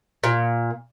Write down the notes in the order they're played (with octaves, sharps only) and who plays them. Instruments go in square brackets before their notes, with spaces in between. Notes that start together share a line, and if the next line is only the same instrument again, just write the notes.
[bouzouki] A#2